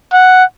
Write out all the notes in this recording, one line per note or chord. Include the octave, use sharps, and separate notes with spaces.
F#5